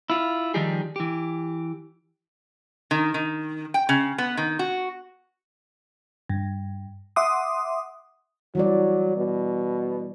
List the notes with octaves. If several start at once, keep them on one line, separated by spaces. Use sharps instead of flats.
E4 F4
D#3 F3 G3 D#4 G4 G#4
E3 G4
D#3
D#3
G5
C#3
B3
D#3
F#4
G2
E5 F#5 C6 D6 D#6
E3 F#3 G3 D5
B2